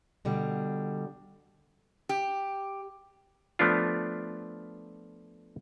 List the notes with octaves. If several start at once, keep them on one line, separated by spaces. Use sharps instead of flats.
B2 D3 G3
G4
F3 A3 B3 D4 F4